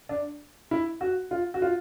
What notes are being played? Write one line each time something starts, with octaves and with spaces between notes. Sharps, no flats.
D4
E4
F#4
F4
F#4
F4